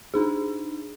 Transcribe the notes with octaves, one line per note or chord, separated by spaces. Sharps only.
D4 D#4 G#4